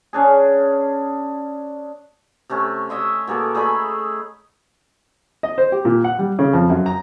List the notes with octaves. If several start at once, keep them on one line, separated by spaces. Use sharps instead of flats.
C#4 D4 G#4
C3 A3 C#4
C#5 D#5 E5 C6
B2 A#3 G#4 A4
A3 G#4 D#5 B5
D#5
C5
G4
A#2
F#5
G3
C#3
F2
F#2
A#5